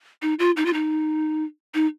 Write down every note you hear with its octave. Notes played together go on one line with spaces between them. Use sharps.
D#4
F4
D#4
F4
D#4
D#4